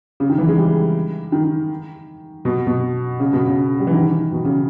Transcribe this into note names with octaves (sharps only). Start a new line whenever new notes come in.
C#3
D#3
E3
G#3
G3
D#3
B2
B2
C#3
B2
C#3
G3
E3
D#3
B2
C#3